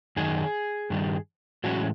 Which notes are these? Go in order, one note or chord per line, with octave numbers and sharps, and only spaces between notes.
F#2 D#3 G#3 D#4 G#4
G2 D#3 G3
A2 E3 F#3 G#3 C#4 F#4